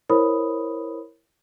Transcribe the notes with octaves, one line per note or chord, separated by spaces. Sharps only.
E4 A#4 C5 C#5 B5 D#6